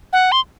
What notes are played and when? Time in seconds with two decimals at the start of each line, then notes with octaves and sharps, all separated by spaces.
0.13 F#5
0.32 C6